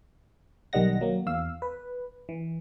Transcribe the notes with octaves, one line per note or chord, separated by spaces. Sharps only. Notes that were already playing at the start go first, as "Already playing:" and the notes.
B1 D#3 G3 D#5 F#5 A#6
F#3 A#3
E2 F5 E6
B4
E3